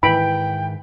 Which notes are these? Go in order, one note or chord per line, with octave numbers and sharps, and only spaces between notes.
G#2 D#3 E3 G5 B5 D7